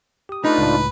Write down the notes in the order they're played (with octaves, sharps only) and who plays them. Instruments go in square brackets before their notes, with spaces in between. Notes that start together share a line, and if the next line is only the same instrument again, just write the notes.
[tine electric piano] G4 D#6
[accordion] A3 D4 F4 [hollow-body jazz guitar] D#4 [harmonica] B4
[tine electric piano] C#2 A2